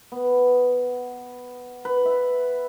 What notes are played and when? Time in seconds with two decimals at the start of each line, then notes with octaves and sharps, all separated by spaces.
0.12 B3
1.85 B4
2.05 E5